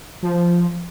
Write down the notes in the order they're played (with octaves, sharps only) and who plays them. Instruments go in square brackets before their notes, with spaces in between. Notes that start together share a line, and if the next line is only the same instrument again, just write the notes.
[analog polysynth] F3